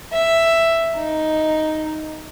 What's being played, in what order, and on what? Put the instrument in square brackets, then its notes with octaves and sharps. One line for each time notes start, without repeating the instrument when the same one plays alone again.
[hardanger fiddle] E5
D#4